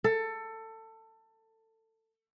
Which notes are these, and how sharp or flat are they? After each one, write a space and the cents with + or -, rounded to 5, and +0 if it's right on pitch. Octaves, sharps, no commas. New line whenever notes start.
A4 +20